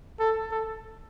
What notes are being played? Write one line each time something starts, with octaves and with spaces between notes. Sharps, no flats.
A4
A4